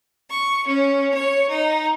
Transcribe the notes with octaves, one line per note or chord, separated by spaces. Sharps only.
C#6
C#4
C#5
D#4